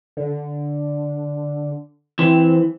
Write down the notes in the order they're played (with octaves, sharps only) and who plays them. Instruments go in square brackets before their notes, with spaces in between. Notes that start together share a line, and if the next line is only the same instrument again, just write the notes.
[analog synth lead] D3
[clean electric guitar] E3 [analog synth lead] C4